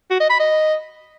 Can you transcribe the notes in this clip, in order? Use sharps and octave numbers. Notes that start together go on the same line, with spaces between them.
F#4
D#5
B5
D#5